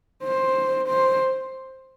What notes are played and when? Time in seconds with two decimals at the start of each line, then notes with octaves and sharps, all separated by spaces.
0.24 C5
0.88 C5